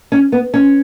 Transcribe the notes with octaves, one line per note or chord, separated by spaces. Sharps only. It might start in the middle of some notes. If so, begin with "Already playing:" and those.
C#4
B3
C#4